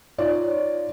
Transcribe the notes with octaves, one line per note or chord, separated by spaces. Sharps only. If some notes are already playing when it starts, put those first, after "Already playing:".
D#4 F4 C#5 D5